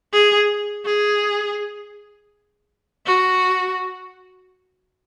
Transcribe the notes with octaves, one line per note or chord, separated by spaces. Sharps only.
G#4
G#4
F#4